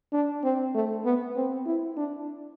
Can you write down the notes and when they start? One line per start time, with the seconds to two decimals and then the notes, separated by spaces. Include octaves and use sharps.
0.13 D4
0.43 C4
0.75 A3
1.05 B3
1.36 C4
1.66 E4
1.97 D4